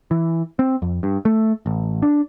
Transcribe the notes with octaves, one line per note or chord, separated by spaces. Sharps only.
E3
C4
F2
G2
A3
A1
D4